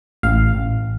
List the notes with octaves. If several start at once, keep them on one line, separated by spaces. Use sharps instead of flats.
A1 F5
A1